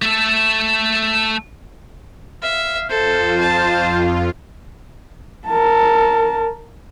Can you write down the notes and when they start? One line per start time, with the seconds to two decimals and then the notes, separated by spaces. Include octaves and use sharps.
0.02 A3 A4
2.43 E5 F5
2.90 F2 F4 A4 C5
3.40 A5
5.48 A#4 A5